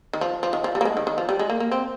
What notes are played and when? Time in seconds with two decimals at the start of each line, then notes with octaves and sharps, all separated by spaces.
0.13 D#3
0.21 F3
0.43 F3
0.53 D#3
0.64 F3
0.75 G3
0.81 A#3
0.85 G#3
0.97 D#3
1.07 D#3
1.18 F3
1.29 G3
1.39 G#3
1.50 A#3
1.60 A#3
1.71 C4